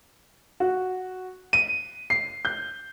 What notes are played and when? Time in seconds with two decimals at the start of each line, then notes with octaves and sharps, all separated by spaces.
0.60 F#4
1.53 D#7
2.10 C7
2.45 G6